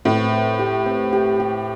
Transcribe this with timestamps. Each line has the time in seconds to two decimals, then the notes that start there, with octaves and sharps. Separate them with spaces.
0.05 A2 C4
0.32 C5
0.59 G4
0.86 C4
1.13 G4
1.40 G4